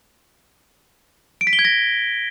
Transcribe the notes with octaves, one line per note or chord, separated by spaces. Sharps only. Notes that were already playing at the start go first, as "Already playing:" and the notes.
D7
B6
G7
G#6
A#6